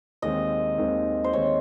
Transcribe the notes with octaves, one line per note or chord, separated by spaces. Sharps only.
D#2 D#3 G#3 C4 D#5
D#2 D#3 G#3 C4
C5
D#2 D#3 G#3 C4 C#5